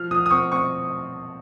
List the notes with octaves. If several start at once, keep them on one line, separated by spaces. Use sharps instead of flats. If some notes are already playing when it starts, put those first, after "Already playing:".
Already playing: F3 F6
F3 D#6
D#6
C4 C#6
C4 C#6